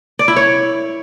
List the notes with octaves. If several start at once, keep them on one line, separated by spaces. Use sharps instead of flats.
D5
E4
C#5